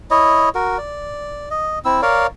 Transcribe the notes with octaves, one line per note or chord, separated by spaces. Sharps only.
E4 C#5 D#5
F#4 A#4
D5
D#5
C4 E4 E6
A#4 C#5 D5 F5